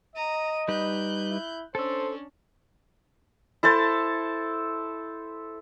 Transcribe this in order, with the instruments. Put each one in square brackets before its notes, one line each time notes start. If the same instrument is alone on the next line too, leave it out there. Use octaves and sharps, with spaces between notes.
[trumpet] D#5 [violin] A#5 D#7
[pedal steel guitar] G3 D#4 B4 [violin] F#6 G6
[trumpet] E4
[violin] C#4 D4 [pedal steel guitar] A4 E6 [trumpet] C5
[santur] E4 A4 C5 A5